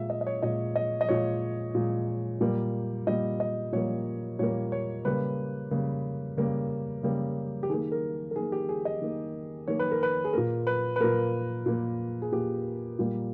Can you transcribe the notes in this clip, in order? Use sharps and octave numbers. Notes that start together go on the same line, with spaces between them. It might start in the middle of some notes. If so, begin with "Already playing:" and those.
Already playing: A#2 G#3 E5
D#5
D#5
C#5
A#2 G#3 D#5
D#5
D#5
A#2 G#3 C#5
A#2 G#3
A#2 G3 A#3
A#2 G3 A#3 D#5
D#5
A#2 G3 A#3 C#5
A#2 G3 A#3 C#5
C#5
C#3 G3 A#3 B4
C#3 G3 A#3
C#3 G3 A#3
C#3 G3 A#3
G4
D#3 A#3 G#4
A#4
A#4
D#3 A#3 G#4
G4
G#4
D#5
D#3 A#3
D#3 A#3 C#5
B4
A#4
B4
G#4
A#2 A#3 A#4
B4
B4
A#2 A#3 A#4
A#2 A#3
G#4
A#2 A#3 G4
A#2 G3 A#3